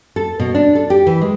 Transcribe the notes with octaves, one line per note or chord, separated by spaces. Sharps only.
A4
B2
D4
A4
G4
E3
G#3